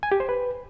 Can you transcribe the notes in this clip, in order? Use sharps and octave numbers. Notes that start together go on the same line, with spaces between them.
G#5
G4
C5
B4